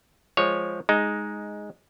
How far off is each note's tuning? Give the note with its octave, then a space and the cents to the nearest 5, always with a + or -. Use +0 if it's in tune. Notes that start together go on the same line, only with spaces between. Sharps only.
F3 +0 G#3 +0 C#5 +0
G#3 +0 D#4 +0